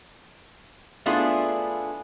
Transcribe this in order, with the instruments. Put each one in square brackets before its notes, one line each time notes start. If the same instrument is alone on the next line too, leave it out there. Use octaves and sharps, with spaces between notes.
[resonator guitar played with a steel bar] A3 B3 D4 E4 F4 G#4